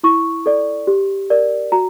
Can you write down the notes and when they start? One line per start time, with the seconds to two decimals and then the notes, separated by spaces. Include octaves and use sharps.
0.03 E4 C#6
0.46 A4 D5
0.87 G4
1.30 A#4 D5
1.72 F#4 A#5